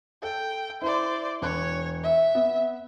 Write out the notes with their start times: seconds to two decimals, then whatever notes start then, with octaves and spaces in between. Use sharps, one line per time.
0.23 A4 G5
0.82 E4 C5 D5
1.42 E1 C#5 F#6
2.03 E5
2.35 B3